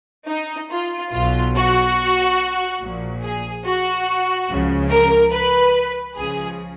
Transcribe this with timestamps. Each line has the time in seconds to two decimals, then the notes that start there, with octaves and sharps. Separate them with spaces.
0.28 D#4
0.70 F4
1.12 B1 B2 F#3 F4
1.54 F#4
2.80 A#1 A#2 F3
3.22 G#4
3.64 F#4
4.49 C#2 C#3 F3
4.91 A#4
5.32 B4
6.17 C#2 C#3 F3 G#4